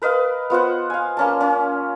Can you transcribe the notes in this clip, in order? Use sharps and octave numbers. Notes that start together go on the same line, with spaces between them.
A#4 B4 D#5 F5
B3 F4 C5 F#5
F5 G#5
A#3 C#4 A5
C#4